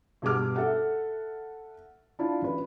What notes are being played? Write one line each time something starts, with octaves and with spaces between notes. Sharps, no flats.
G2 B2 G#4 F#5 D6 F6
A4 E5 F#5
D4 E4 F4
A1 B4